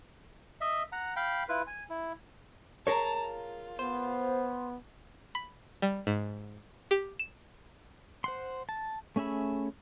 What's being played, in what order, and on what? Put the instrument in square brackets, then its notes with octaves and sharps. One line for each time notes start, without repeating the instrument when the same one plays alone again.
[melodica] D#5 E5
F#5 A#5
F5 G5 B5
E4 F4 B4
G#5
E4
[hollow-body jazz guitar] G#4 A#4 C#5 [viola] A5 A#5
[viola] F4
[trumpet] B3 [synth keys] C5
[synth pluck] B5
G3
G#2
G4
E7
[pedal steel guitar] C5 F#5 C6
A5
A3 C#4 G#4 E5 B5